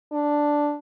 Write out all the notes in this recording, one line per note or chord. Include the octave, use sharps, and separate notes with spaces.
D4